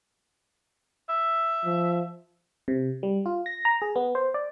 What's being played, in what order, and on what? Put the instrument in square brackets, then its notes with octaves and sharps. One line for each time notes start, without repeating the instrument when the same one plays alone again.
[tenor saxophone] E5
[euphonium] F3
[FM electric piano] C3
G3
F4
A#6
A#5
G#4
B3
C5
D5